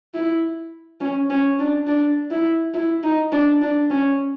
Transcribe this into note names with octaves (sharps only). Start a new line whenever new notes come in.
E4
C#4
C#4
D4
D4
E4
E4
D#4
D4
D4
C#4